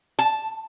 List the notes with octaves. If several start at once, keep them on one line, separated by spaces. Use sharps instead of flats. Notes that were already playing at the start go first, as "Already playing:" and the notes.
A5